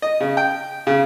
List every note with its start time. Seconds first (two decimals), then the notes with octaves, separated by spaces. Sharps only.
0.02 D#5
0.20 C#3
0.37 G5
0.87 C#3